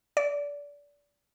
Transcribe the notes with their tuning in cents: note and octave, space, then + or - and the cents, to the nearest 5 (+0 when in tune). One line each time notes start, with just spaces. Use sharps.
D5 -25